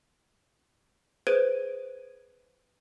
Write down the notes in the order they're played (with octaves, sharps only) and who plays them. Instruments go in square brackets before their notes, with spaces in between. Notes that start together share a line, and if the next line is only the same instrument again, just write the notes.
[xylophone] G#4 B4 C5 G#6 D7 D#7